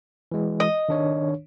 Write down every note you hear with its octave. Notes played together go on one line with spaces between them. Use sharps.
E3 G#3
D#5
D#3 D4 C#5